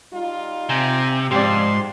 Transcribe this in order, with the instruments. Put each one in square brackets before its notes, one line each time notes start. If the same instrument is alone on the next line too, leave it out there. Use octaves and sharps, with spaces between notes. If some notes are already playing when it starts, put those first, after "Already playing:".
[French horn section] G3 D#4 F4
[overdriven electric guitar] C3 [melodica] G5 G#5 A#5
[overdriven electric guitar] G#2 [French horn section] F3 [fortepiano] G4 D5 [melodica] C6